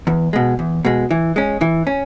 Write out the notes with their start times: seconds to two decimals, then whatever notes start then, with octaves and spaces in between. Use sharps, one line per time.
0.07 E2
0.33 B2 G#3
0.59 E2
0.85 B2 G#3
1.11 E3
1.36 G#3 C#4
1.61 E3
1.87 C#4